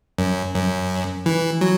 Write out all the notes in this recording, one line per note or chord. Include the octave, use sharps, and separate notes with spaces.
F#2
F#2
E3
F#3